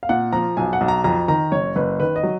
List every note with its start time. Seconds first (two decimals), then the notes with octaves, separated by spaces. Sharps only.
0.03 F5
0.09 A#2 F#5
0.33 F3 A#5
0.57 B1 G#5
0.73 F#5
0.81 B1
0.88 A#5
1.04 F2 A#5
1.28 D#3 A#5
1.52 F#1 C#5
1.76 F#1 B4
2.00 D#3 B4
2.16 D#5
2.23 F#3